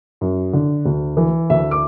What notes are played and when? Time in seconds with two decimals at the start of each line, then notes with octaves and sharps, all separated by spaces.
0.21 F#2
0.53 D3
0.85 D2
1.17 E3
1.50 D2 E5
1.71 D6